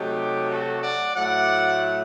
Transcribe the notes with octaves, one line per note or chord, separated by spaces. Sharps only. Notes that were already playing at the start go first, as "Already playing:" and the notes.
Already playing: C3 F#3 A3 D#4 G4
F#4 A4
D5 F#5
A2 F#3 A3 D5 F#5